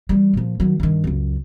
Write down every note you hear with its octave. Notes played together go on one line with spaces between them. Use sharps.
E3 G3
A#2 F3
D#3 F#3
G2 D#3
C#2 F#2